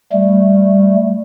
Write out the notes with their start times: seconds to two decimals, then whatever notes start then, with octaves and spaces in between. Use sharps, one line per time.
0.12 G3 A3